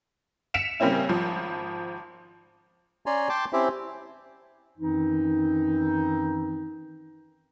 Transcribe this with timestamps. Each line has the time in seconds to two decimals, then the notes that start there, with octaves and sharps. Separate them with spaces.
0.54 B6 C#7 D7 E7 F7
0.80 C#3 G3 A#3 C4 C#4 E4
1.09 G#1 F3
3.06 C#4 C#5 D5 G#5 A#5 C6
3.29 G5 A5 C6 D6
3.53 C4 C#4 E4 G4 C5 E5
4.78 F#2 D#3 E3 C4 D#4